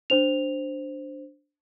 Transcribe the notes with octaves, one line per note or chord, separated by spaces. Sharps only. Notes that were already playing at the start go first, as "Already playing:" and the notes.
D4 C5 F7